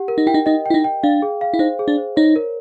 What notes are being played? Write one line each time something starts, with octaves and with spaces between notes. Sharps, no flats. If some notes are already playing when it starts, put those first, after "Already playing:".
Already playing: G4 F#5
A#4
D#4
E4 G5
D#4
D#4 D#5
E4 G5
D#4
G5
D4 F5
G#4
F5
E4
D#4 C5
G#4
D4
C5
D#4 C#5
A#4